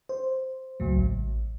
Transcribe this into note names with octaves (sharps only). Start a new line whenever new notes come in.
C5
C#2 A2 F#3
A1